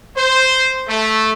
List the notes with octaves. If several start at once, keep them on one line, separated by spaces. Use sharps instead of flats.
C5
A3